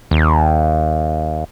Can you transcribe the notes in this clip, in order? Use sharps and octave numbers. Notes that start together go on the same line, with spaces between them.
D#2